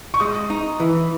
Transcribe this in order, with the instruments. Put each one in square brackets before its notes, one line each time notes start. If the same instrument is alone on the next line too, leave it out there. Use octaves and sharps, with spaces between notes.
[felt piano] C#6
[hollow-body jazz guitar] G#3 [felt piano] D#6
[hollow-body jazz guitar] D#4
E3